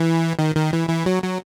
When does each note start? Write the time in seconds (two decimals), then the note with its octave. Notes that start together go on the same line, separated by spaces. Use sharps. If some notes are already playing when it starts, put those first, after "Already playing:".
Already playing: E3
0.39 D#3
0.55 D#3
0.73 E3
0.89 E3
1.06 F#3
1.23 F#3